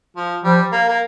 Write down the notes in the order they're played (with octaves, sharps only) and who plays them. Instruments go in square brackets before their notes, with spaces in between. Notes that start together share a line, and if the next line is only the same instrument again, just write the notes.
[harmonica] F3
[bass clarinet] F3 [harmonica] G3
[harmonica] A#3
A#3